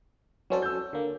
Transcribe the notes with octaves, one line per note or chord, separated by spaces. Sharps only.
F#3 C#4 F#4 A4 C5 D5
E6 G6
D3 A#3